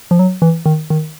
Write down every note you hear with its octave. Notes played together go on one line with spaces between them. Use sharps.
F3
F#3
E3
D#3
D#3